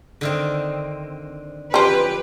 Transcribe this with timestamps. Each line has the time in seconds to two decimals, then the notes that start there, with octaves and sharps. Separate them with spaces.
0.21 D3 D#3 C4
1.74 E3 F3 C#4 G4 B4 C5